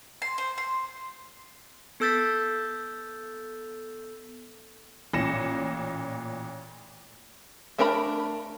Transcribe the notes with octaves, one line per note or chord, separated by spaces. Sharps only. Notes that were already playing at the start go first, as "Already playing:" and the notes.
C6
C5
C6
B3 A4 E6 G6 A6 B6
A1 A#2 A#6 C#7 E7
A3 D4 A#4 A#5 B5